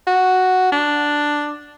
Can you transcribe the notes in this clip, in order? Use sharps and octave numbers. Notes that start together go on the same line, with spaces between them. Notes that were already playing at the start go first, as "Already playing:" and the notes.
F#4
D4